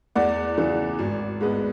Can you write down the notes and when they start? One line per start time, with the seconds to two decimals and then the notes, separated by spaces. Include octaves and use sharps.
0.16 E2 D5 F#5
0.58 C#3 E3
0.99 G#1
1.41 G#2 G#3 B3